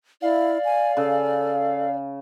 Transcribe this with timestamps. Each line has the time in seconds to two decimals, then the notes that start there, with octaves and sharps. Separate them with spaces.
0.22 E4 D5 F5
0.65 G#5
0.97 C#3 A4